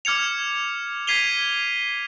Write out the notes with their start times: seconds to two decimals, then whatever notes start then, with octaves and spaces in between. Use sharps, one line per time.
0.05 D6 F6 G#6 C#7 F7
1.07 G#6 B6 C7 D#7 F7 G7